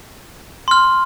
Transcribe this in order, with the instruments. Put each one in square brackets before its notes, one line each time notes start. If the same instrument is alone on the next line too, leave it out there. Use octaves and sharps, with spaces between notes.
[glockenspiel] C6 F6